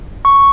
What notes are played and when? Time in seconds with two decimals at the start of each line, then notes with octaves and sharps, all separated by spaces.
0.25 C#6